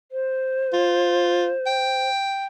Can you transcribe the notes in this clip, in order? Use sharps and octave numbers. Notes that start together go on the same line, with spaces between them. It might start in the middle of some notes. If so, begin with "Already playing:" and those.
C5
F4
G5